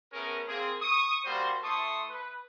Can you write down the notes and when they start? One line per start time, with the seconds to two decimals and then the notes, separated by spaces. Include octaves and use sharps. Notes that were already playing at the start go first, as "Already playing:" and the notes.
0.13 A3 B3 C#4 G#4 A#4
0.47 A#3 C4 G#4
0.80 C#6 D#6
1.25 G3 A#3 F#4 C5
1.63 A3 E4 A4 C6 C#6 D#6
2.09 B4